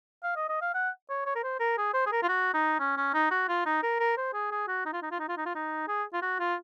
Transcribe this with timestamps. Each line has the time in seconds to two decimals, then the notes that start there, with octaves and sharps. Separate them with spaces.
0.23 F5
0.36 D#5
0.48 D#5
0.62 F5
0.74 F#5
1.10 C#5
1.26 C#5
1.35 A#4
1.43 C5
1.60 A#4
1.78 G#4
1.94 C5
2.06 G#4
2.12 A#4
2.23 F4
2.29 F#4
2.54 D#4
2.79 C#4
2.97 C#4
3.14 D#4
3.31 F#4
3.48 F4
3.66 D#4
3.83 A#4
3.99 A#4
4.17 C5
4.33 G#4
4.51 G#4
4.68 F#4
4.86 D#4
4.93 F4
5.02 D#4
5.12 F4
5.19 D#4
5.29 F4
5.38 D#4
5.46 F4
5.55 D#4
5.88 G#4
6.13 F4
6.22 F#4
6.40 F4